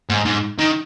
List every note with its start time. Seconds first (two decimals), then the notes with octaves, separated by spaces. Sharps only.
0.10 G#2
0.25 G#2
0.59 D#3